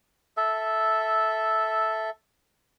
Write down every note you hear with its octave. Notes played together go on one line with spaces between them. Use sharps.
A4 E5